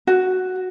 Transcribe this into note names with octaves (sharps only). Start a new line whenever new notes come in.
F#4